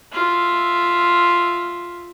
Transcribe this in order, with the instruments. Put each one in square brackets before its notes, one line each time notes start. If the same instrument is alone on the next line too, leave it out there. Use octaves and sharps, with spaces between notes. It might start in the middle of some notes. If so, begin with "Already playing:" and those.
[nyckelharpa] F4 E5